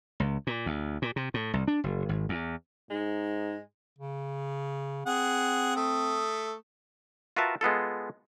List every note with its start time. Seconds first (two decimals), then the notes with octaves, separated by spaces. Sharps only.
0.20 C#2
0.47 A#2
0.66 D2
1.02 A#2
1.16 C3
1.34 A2
1.53 C2
1.68 D4
1.84 F#1
2.09 G#1
2.29 E2
2.90 G#2 G#3 D#4
3.99 C#3
5.06 C4 G#4 F#5
5.76 A3 D#6
7.36 F4 F#4 A#4 B4 E5 A5
7.61 G#3 B3 F4 A4